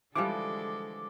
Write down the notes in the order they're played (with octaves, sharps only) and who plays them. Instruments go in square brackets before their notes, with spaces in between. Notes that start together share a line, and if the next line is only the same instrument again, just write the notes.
[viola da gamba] D3 G#3 A4 [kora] E3 F3 G3 [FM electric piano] D6